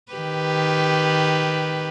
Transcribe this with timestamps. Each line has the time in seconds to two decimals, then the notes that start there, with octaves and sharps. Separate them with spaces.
0.12 D#3 G4 B4